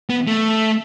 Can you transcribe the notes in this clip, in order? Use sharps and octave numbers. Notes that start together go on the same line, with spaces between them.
B3
A3